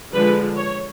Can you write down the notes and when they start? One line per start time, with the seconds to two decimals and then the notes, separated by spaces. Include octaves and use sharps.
0.11 D3 F3 G#3 B4
0.56 C#5